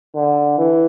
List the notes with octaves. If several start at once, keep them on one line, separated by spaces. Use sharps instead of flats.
D3
E3